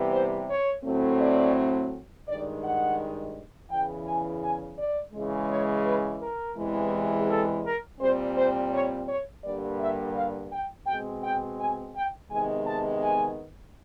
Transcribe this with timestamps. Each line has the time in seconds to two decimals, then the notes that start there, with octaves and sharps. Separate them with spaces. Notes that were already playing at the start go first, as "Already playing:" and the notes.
Already playing: C3 E3 G3 B3
0.13 C5
0.48 C#5
0.84 A2 F#3 A3 C4
1.19 D5
2.28 G2 D#3 G#3 D5
2.63 F#5
3.70 E2 C#3 E3 G5
4.07 G#5
4.42 G#5
4.78 D5
5.13 C#3 E3 G#3
5.50 C#5
5.86 B4
6.21 A#4
6.57 E2 C3 E3 G#3
7.30 A4
7.65 A#4
8.00 A#2 G3 C4 C5
8.37 C5
8.73 C#5
9.08 C#5
9.44 G2 D3 G3 A#3 D5
9.80 E5
10.15 F5
10.52 G5
10.87 B2 G#3 C4 G5
11.23 G5
11.59 G#5
11.95 G5
12.31 C3 D#3 G#3 B3 G#5
12.67 A5
13.02 G#5